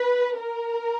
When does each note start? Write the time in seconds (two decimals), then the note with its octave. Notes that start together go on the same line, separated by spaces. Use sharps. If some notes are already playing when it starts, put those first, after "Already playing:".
Already playing: B4
0.38 A#4